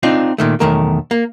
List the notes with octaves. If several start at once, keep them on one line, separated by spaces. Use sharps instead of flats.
C4 D4 D#4 F4
A#2 D#3 A3
B1 E2 D#3 A3 A#4
A#3